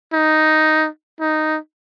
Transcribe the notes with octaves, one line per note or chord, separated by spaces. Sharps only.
D#4
D#4